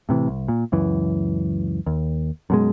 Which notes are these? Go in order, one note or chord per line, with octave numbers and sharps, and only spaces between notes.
A2 C3 E3
C2
A#2
C#2 F#2 E3
D#2
F#2 B2 G#3